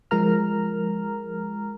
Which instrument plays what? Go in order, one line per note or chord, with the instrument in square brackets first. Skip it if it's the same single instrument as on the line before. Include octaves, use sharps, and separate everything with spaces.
[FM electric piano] F3 G#3 A#4 A#5 F6